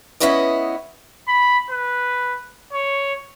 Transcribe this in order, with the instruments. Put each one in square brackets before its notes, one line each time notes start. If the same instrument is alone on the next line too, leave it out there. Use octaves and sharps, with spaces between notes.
[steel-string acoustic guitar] B3 C#4 E4 B4 D5 D#5
[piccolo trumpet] B5
B4
C#5